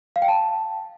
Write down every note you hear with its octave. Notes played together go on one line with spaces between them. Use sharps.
F5
G5
A5